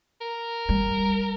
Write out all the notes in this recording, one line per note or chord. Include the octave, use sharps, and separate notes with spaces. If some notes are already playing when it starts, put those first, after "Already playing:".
A#4
G3